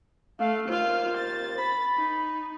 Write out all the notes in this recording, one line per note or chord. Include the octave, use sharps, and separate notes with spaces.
A3 F5
D#2 F4 C5 F5
A6
B5
D#4